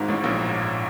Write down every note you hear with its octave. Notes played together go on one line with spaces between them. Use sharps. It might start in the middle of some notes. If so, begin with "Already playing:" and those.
Already playing: G#1 G#2
A1 A2
A#1 A#2